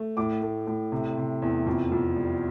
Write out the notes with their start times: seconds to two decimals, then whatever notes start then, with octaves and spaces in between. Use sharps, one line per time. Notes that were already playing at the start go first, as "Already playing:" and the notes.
Already playing: A3
0.17 A2 D6
0.41 A3
0.67 A2
0.92 C3
1.17 C3
1.42 E2
1.67 F2
1.92 F2
2.16 G3